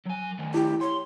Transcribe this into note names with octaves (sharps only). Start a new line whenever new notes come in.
F#3 G#5
D#3 A3
E4 G4
C#5 C6